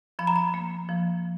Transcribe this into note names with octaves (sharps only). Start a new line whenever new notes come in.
F3 B5
A#5
B5
A#3
F3